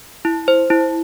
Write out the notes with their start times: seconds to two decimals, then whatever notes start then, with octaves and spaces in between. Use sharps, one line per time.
0.25 E4
0.48 C5
0.70 E4